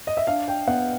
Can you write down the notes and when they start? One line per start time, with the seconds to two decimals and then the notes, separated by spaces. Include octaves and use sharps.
0.07 D#5
0.17 E5
0.27 D4 F5
0.48 G5
0.68 B3 F#5